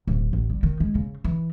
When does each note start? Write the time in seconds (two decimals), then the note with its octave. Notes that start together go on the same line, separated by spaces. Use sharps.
0.07 D1
0.33 A1
0.50 G3
0.63 D#3
0.80 G#3
0.95 C#3
1.24 E3